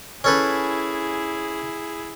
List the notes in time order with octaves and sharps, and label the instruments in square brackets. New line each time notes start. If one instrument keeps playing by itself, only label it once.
[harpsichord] C#4 A4 B4 [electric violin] E4 G#4